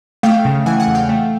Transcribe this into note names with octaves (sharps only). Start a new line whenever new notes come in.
A3 F5 G5
C#3
E3 F#5 G#5
F#5 G#5
E2
F5 G5
A3